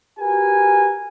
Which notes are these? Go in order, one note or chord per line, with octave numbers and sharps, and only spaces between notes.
F#4 G4 A#4 B4 G#5